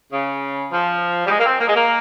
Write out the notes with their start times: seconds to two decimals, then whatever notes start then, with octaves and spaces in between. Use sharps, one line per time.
0.13 C#3
0.72 F3
1.26 G3
1.30 G#3
1.39 A#3
1.45 C4
1.60 A#3
1.67 G#3
1.75 A#3